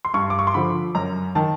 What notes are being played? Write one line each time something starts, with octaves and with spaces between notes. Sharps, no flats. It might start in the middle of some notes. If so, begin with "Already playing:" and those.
C6
G2 C#6
D6
C#6
C6
D3 F3 B5
F#2 A#5
D#3 A5